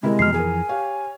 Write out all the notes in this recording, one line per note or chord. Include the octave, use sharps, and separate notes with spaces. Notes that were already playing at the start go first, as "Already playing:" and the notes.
C3 G#3 E4 A#4
F2 B2 E3 A#5 F6 C7
G#4 A#4 G#5
G4 C#5 F5